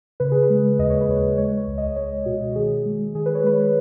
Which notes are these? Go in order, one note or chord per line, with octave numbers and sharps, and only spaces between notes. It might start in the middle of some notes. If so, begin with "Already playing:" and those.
C#3 B4
G#4
B4
G#3
D#2 D#5
C#5
B4
D#2 C#5
G#3 C#5
C#5
C#2
D#5
G#3 C#5
B2 F#4
D#3 G#4
G#3
D#3 G#4
B4
C#5
G#3 B4
C#5